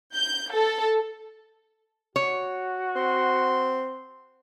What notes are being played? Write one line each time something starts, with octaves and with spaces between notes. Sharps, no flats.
G6
A4
F#4 C#5
C4 C6